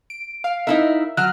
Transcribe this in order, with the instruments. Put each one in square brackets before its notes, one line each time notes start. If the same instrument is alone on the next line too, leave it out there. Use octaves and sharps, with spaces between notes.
[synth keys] D7
F5
[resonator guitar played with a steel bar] D#4 E4 A#4 [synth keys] E5
[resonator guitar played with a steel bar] F#3 [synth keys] F6 F#6